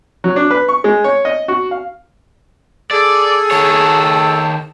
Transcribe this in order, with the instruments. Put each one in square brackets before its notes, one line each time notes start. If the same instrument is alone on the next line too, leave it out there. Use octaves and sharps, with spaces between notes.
[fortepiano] F#3
D4
B4
C#6
G#3
C#5
D#5
F#4
F5
[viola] G#4 [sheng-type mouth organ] A4 [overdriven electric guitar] D5
[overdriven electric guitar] D#3 C#5 [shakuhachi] A5